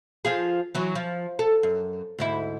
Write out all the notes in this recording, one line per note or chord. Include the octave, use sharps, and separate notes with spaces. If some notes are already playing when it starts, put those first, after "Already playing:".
F3 F4 G#4
E3 F#3
F3
A4
F#2
D2 G#2 E4